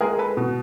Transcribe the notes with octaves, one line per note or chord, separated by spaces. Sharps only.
G#3 G#4 A#4
A4 B4
B2